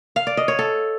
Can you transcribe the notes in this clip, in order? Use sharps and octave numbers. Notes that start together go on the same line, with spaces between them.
F5
D5
D#5
C#5
A4